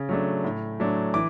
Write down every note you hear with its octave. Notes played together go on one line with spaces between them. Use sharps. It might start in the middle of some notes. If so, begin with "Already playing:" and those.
Already playing: C#3
F#3 A3 D4
A2
F#3 A3 D4
E3 D6